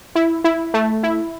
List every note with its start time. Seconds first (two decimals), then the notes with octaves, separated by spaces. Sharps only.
0.15 E4
0.44 E4
0.74 A3
1.03 E4